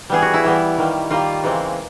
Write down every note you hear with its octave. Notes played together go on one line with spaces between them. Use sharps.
E3 G3 B3 G#4
F#4
E4
E3 G3 B3
D#3 G3 A#3
D#3 G3 A#3 F4
C#3 E3 G#3 C4